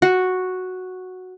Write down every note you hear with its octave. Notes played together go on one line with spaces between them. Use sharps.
F#4